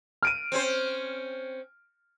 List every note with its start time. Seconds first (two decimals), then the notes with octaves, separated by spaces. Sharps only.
0.23 F6 D7 D#7
0.52 C4 C#4 C5